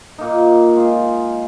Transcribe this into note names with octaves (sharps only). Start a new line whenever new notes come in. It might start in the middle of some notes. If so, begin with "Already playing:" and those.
A#2 A#3 D#4
G#3 F4 G#4